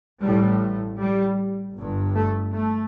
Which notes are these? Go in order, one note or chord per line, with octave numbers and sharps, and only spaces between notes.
A1 A2 G3
G3
G1 G2
A3
A3